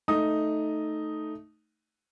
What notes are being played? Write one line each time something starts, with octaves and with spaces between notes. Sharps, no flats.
A3 D#4 D#6